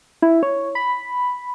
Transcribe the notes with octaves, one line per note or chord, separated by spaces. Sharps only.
E4
C#5
B5